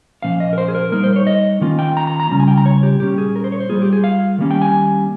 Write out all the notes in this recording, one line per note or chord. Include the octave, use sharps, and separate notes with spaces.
A#2 F3 A#3 C#4 F5
D#5
A#4
C5
G#4
A#4
G3 A#3 D#4 A#4
C5
C#5
D#5
D#3 A#3 C#4 F4
G5
A#5
A#5
A#5
C#3 G3 C#4 F4 A#5
G#5
G5
A#5
C#5
G4
A#2 G3 A#3 C#4 G4
G#4
A#4
C5
C#5
C5
G3 A#3 F4 G#4
G4
G#4
F5
D#3 G3 A#3 C#4
G5
G#5